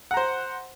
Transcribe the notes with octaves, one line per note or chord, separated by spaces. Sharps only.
C5 F#5 A#5